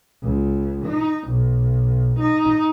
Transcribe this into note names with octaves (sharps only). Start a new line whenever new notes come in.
C#2
D#4
B1
D#4